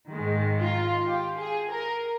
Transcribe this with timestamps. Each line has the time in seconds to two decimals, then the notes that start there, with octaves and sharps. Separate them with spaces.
0.12 G#2 D#3 G#3
0.60 F4
1.07 G4
1.39 G#4
1.70 A#4